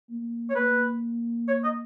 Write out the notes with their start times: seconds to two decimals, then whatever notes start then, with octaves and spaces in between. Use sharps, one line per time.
0.10 A#3
0.50 C#5
0.55 A#3 B4
1.48 C#5
1.64 D#5